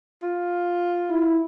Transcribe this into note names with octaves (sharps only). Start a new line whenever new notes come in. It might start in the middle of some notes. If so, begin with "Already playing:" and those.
F4
E4